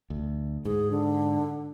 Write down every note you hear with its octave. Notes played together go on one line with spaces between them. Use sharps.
D2
G#2 G#4
D3